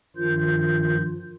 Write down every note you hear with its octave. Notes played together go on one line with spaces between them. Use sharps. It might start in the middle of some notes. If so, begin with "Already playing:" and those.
G2 D#3 F3 F4 G6